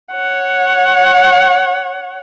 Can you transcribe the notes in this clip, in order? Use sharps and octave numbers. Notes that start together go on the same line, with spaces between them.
C#5 F#5